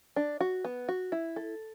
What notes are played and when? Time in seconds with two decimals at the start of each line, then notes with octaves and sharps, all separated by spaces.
0.16 D4
0.40 F#4
0.65 B3
0.89 F#4
1.12 E4
1.36 A4